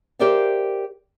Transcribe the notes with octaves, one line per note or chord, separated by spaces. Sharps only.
G4 A#4 C5 D5 E5 F5